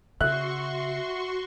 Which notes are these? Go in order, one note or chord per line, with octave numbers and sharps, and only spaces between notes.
C#3 F#4 E5 C6 C#6 F#6